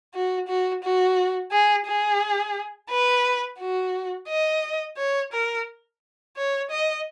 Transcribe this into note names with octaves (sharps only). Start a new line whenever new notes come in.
F#4
F#4
F#4
G#4
G#4
B4
F#4
D#5
C#5
A#4
C#5
D#5